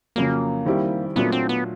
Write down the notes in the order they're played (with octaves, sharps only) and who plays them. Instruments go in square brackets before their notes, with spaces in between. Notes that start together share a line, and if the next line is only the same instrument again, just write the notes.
[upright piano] F2 C#3 F#3 [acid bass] A#3
[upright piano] D#3 G3 C4 E4 G4
[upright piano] A#2 F#3 A3 D4 F#4 [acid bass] B3
[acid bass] C4
B3